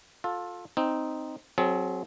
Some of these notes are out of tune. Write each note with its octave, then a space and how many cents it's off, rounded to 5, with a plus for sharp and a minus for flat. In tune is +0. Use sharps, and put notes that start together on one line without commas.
F4 +25 A4 +0
C4 +0 D#4 +0
F#3 +0 C4 +15 G#4 +45